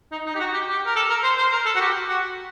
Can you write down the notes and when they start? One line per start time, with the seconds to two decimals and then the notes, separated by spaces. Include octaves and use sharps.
0.12 D#4
0.26 D#4
0.35 G4
0.39 F#4
0.53 G4
0.68 G4
0.86 A#4
0.96 A4
1.09 A#4
1.23 C5
1.38 C5
1.52 A#4
1.65 A4
1.75 F#4
1.80 G4
2.08 F#4